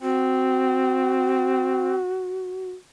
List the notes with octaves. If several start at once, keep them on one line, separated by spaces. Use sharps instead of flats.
C4 F#4